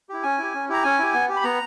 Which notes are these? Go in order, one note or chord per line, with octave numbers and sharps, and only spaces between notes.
E4 G4
C#4 G#5
E4 G4
C#4
E4 G4 A#5
C#4 G#5
E4 G4
B3
G4
B5
B3 A#5